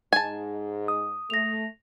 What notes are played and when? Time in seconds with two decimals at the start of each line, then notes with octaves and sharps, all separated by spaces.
0.13 G#2 G#5 A5
0.88 D#6
1.30 A3 A#6 F7